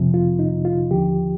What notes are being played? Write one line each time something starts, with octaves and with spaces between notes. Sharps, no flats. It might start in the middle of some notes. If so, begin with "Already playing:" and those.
Already playing: F2 C3 F3
F4
D#4
F4
D#2 D3 F3 G4